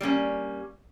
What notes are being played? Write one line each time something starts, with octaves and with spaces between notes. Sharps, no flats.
G3 A#3 C4 C#4